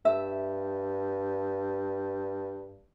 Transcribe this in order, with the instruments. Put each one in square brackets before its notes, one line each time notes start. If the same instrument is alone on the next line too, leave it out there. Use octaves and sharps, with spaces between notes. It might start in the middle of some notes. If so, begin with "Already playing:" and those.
[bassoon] G2 [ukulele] E5